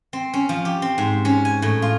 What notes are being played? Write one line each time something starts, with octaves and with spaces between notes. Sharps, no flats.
C4
C#4
F3
G4
C4
G#2
C#4
G#5
A2
F4